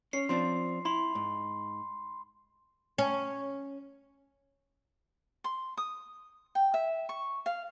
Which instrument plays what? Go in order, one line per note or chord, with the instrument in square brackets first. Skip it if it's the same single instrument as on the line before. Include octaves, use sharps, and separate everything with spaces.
[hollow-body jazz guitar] C#4 C#5 [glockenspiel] C7
[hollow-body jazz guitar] F3 C4 D4 [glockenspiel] C6
[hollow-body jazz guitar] E4 [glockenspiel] B5 C6
[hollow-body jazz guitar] G#2
[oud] C#4
[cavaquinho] C6
D#6
G5
E5
C#6
F5